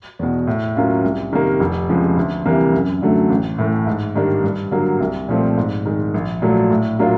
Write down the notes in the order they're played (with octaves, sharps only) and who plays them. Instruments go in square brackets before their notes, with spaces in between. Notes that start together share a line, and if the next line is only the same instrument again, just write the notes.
[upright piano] E2 B2
A2
F#3 A#3 C#4 F4
C2
C3 D#3 G3 A#3
F1
F2 C#3 F3 G#3
D2
C3 E3 G3 A#3
F#2
D3 F#3 A3
A1
A2 E3 A3
G#2
D#3 G3 A#3 D4
G2
D3 F#3 A#3
C2
A#2 F3 A3 C4
G#2
D#3 G#3
A#1
A#2 F#3 A3
A2
F#3 A#3 D4 F4